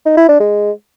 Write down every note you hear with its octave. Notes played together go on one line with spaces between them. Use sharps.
D#4
E4
D4
G#3